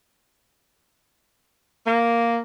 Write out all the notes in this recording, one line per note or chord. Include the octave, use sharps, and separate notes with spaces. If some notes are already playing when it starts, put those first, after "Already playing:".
A#3